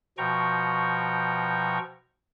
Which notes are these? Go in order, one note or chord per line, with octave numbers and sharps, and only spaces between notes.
B2 F3 G5 A#5 C#6